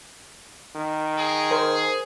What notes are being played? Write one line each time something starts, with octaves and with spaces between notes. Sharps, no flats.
D#3
G#4
A#4 C5